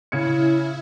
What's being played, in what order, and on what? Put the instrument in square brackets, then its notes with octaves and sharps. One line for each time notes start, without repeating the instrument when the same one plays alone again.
[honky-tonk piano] C#3 G#6 C#7 [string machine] E4